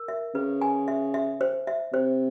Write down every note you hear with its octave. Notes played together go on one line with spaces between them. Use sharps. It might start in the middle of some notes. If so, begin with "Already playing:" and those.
Already playing: A#4
E5
C#3 B4
G#5
E5
E5
C5
E5
C3 C5